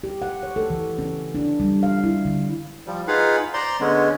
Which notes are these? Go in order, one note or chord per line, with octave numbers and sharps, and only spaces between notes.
G4
F#5
C#5
A4
E3
C#4
D4
G3
F5
E4
D3
F3 G3
D#4 F4 G#4 B4 F5 F#5
C5 D5 A#5 C6
D3 G#3 B3 C#4